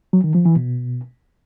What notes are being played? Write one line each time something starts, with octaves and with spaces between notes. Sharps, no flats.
F#3
D#3
F3
E3
B2